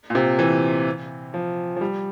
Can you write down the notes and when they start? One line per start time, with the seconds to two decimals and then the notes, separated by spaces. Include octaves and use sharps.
0.10 A#2
0.15 C3
0.39 E3
1.34 F3
1.76 F3
1.81 G3